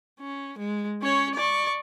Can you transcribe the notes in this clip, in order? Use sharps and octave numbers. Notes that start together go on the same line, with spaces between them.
C#4
G#3
C#4 C#5
D5 C#6